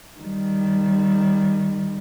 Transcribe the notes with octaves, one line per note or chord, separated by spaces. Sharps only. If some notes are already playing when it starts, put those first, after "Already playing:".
D#3 G3